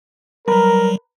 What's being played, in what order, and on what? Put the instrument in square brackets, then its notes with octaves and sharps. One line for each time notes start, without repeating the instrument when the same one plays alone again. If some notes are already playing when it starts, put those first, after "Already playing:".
[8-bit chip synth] F#3 G3 [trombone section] A#4 [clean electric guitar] B4 A#5 B5